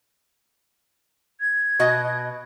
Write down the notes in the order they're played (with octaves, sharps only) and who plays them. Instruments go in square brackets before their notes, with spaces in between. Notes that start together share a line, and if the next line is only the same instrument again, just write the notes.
[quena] G#6
[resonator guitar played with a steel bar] B2 F#4 D#5